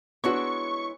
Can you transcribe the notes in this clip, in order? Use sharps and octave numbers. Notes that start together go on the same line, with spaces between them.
G#3 B3 D4 E4 F#4 C#5 C#6